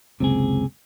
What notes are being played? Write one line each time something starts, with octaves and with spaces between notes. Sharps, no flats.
F#1 C#2 C3 C4 G#4